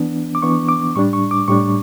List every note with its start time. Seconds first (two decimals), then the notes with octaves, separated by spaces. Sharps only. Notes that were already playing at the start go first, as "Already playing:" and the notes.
Already playing: E3 B3 D4
0.35 D6
0.42 E3 B3 D4 C#6
0.69 D6
0.96 A2 G3 D4 C#6
1.13 C#6
1.31 D6
1.48 A2 G3 D4 C#6